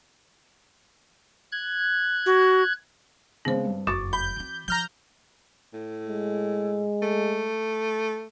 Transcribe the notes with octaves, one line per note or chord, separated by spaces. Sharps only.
F#6 G#6
F#4
C#3 G#3 B3 C4 C5
G2
F#1 F2 F#4 C#6 D6 A6
B5 G6
E3 C4
F3 A#5 F6 G6
A2
G#3
A3